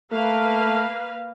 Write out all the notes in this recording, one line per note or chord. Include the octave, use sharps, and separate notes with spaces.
A3 A#3 B4 F5